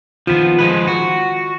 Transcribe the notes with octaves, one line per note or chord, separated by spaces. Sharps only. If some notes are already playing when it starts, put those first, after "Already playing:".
D#3 F3 B3 F4
F3 G#3 B4
F#4